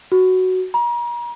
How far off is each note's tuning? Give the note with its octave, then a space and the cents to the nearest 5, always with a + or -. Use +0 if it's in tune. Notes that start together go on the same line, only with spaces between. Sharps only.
F#4 +5
A#5 +40